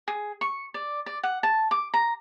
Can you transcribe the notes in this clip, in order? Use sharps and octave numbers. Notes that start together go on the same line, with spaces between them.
G#4
C#6
D5
D5
F#5
A5
D6
A#5